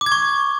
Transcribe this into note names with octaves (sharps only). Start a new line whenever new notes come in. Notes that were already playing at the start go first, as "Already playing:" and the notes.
D6
G#6
C#6